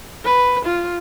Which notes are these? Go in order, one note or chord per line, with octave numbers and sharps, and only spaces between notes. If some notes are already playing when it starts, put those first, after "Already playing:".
B4
F4